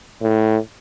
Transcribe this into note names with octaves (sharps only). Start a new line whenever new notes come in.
A2